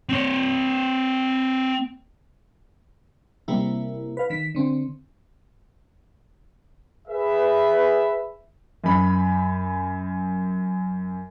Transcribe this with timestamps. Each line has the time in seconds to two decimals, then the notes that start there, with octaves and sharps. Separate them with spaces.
0.09 C4 C#5
3.48 C3 G3 A#3 E4
4.17 B4 F5
4.30 D#3 B6
4.55 D3 C4
7.08 G#4 B4 E5
8.84 F#2 B5